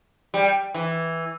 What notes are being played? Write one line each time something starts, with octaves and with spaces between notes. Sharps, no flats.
G3
E3